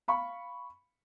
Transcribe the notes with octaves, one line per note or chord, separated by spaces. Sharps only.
F5 B5 C#6